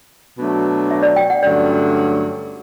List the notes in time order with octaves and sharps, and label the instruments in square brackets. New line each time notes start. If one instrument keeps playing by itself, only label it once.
[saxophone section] B2 F#3 A3 D4
[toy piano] E5
D5
G5
F#5
[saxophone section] G2 D3 F#3 A3 C#4 [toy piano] D5